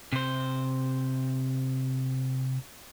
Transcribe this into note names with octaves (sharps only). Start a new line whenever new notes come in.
C3 C5